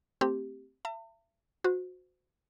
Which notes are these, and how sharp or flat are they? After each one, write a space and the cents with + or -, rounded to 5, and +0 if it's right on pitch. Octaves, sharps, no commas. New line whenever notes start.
A3 +25 C4 -5 G4 +0
E5 +35 A5 +45
F#4 -25 C5 -25